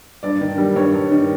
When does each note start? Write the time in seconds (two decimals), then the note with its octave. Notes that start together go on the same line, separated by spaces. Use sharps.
0.23 G2 D5
0.41 D#3
0.58 G3
0.76 G2 C#5
0.93 G2
1.11 D#3